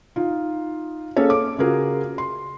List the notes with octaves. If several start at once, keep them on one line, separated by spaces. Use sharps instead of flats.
D#4 F4
A#3 C#4 G#4 A4 C#5
D6
C#3 F4 F#4 G#4 A#4
C6